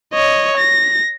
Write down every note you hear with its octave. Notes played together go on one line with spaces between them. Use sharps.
C#5 D#5
A#6